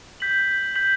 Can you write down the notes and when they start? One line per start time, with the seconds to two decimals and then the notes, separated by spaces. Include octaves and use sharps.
0.20 G6 B6 F#7
0.75 G6 B6 F#7